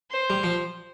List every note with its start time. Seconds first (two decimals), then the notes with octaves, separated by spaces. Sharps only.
0.11 C5
0.30 G3
0.44 F3